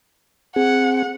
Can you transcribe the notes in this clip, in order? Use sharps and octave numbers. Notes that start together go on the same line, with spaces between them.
C4 G#4 F#5